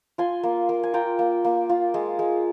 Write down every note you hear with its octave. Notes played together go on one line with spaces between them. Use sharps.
F4 G#5 C6
A#3
A#3
G#5
F4 G5 A#5
A#3
A#3
F4
G#3
G#3